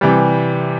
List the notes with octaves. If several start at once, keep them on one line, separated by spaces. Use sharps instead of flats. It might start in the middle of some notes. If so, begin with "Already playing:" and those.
C3 E3 G3